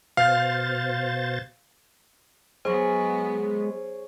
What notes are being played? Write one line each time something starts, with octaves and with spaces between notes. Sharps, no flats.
B2 C5 F5 A6
F#3 G#3 B3 G#4 C5 C#5